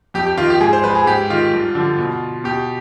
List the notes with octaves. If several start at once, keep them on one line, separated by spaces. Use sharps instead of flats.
F2 G4
G4
D#3 F4
G4
G#2 G#4
C5
F3 B4
G#4
G#2 G4
D#3 F4
G2
D3 F3
B2
B2 G4